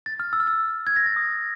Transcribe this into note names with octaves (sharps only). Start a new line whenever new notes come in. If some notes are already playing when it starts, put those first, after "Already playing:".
A6
F6
E6
F6
E6
G#6
A#6
A6
D#6